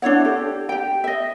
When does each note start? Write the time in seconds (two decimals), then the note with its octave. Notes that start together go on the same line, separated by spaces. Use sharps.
0.02 D4 E4 C#5 F#5
0.25 G4 A4
0.69 G4 G5
1.04 D#5 E5